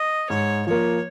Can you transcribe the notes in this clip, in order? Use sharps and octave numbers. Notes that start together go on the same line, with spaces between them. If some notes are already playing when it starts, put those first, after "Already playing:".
Already playing: D#5
G#2 C#5
F3 A#3 C#5